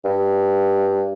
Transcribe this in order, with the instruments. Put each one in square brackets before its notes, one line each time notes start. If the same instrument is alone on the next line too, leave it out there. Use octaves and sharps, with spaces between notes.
[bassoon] G2